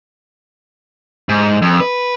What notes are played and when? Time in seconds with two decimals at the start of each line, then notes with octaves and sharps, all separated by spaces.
1.29 G#2
1.62 F2
1.80 B4